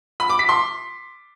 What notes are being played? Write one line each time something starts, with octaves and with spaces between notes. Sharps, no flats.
B5
D6
B6
C6